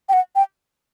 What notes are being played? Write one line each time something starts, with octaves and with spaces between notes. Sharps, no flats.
G5
F#5
G5